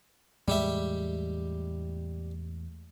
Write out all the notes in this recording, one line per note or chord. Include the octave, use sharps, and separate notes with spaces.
E2 A2 G3 G#3 G4 E5